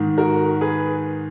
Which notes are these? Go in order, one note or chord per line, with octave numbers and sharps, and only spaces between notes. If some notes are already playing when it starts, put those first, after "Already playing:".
Already playing: G#2 D#3
F#4 A#4
G#4 B4